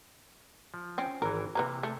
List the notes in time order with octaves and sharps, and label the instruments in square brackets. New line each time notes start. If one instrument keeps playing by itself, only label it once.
[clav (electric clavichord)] F3
[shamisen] C4 C#4
[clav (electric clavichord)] G#1 E3 [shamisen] A#4
[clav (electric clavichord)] C3 A#3 [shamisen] E3 B4 A#5
[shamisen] A3